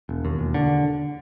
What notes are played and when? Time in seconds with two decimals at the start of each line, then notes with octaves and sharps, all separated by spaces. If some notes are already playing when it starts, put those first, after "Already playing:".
0.09 E1
0.25 D#2
0.39 E1
0.54 D3